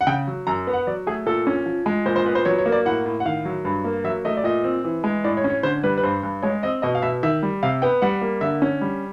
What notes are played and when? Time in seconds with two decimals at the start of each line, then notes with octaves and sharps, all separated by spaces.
0.01 F#5
0.07 C#3 G5
0.27 F#3
0.47 F#2 A#5
0.67 B3
0.73 F#5
0.87 F#3 D5
1.07 A3 G#4
1.26 A#2 A4
1.47 C#4
1.66 F3
1.86 G#3
2.05 A#2 C5
2.16 C5
2.26 B3 B4
2.35 C5
2.45 F#3 C#5
2.58 C#5
2.66 A#3
2.72 D5
2.86 A2 F#5
3.06 A2
3.20 F#5
3.25 D#3 F5
3.45 F#3
3.65 G2
3.84 A#3
4.04 F#3 E5
4.25 A3 D#5
4.37 D5
4.44 A#2 D#5
4.64 C4
4.84 E3
5.04 G#3
5.24 A2 D5
5.37 C#5
5.44 C#4
5.50 C#5
5.63 D3 C5
5.83 G3 B4
5.98 B4
6.03 G2 C5
6.23 G2
6.42 G#3 C#5
6.63 C4 D#5
6.82 B2 D#5
6.95 F5
7.02 B2 E5
7.23 D#3 E5
7.43 G3
7.63 C3 F5
7.82 B3 G5
8.02 G3 F#5
8.21 A#3
8.41 D3 E5
8.62 C#4
8.81 G3